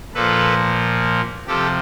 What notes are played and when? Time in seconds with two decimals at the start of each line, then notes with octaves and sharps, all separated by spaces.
0.14 A#2 F3 A4 B4
1.47 C3 F3 G4 A4